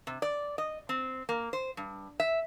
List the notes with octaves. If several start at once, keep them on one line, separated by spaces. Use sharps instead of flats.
C3
D5
D#5
C4
A#3
C5
G2
E5